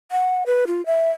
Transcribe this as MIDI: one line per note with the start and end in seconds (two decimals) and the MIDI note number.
0.12 0.44 78
0.46 0.65 71
0.67 0.84 65
0.86 1.10 76